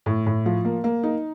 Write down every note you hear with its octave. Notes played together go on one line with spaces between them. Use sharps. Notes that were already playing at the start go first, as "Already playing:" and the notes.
A2
A2
F3
A#3
A#3
D#4